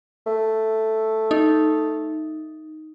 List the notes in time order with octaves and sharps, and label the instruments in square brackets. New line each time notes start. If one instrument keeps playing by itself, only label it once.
[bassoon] A3
[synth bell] D#4